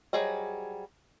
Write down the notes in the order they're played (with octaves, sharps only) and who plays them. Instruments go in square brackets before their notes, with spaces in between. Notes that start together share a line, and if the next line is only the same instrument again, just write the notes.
[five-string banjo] F#3 G3 G#4 C5 D#5